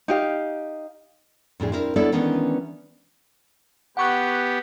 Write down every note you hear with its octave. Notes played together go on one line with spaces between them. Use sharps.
D#4 G4 F5
F2 A2 D4 G#4
C4 D4 E4 A#4
B3 D4 E4 A4 C#5 D5
D#3 E3 G#3 B3 C#4 D4
B3 G4 F#5 C#6 F#6